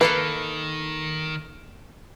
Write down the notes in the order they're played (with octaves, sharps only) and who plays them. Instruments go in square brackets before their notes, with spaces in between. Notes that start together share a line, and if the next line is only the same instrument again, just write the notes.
[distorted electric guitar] D#3 [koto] A#3 A4 F5 [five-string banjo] B4